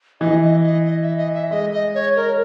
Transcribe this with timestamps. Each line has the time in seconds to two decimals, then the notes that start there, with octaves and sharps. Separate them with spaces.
0.20 E3 D#5
0.42 D#5
0.63 D#5
0.86 D#5
1.02 E5
1.17 D#5
1.34 E5
1.51 G#3 D#5
1.73 D#5
1.95 C#5
2.16 A#4